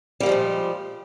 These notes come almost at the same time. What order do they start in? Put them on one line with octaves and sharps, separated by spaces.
G3 A#3 F3 G#3 A#2